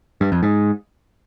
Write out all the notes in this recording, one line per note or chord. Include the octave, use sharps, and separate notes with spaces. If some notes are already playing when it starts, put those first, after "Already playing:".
G2
F2
G#2